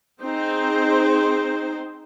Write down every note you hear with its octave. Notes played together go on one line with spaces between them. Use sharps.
C4 D#4 G#4 C5